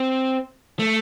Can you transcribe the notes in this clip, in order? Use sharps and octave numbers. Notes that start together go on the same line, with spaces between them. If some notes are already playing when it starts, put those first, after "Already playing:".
Already playing: C4
A3